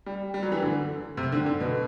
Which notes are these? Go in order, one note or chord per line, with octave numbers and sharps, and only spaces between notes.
G3
G3
F#3
E3
D3
C3
D3
D3
B2